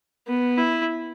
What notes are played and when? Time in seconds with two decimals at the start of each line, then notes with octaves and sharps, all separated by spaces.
0.27 B3
0.58 E4